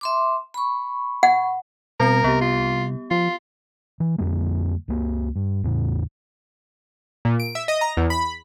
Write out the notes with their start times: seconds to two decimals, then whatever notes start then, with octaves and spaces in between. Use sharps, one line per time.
0.01 E5 C6 D6
0.54 B5 C#6
1.23 F#5
2.00 B2 G3 C4 A#4 A#6
2.24 C2 B3 G4
2.42 F4
3.11 F3 F4
4.00 E3
4.18 F2 D3 G3 A#3
4.88 C#2 A#3
5.36 G2
5.64 E2 A2 C#3
7.25 A#2
7.40 D7
7.55 E5
7.68 D#5
7.81 A#5
7.97 E2
8.10 B5